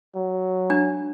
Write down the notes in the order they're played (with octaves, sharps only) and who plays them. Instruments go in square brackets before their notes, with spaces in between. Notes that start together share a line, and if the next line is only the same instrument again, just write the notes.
[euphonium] F#3
[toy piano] D4